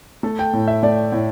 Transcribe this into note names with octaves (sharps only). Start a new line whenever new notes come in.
A3 A4
G5
A2
E5
A3 D5
A2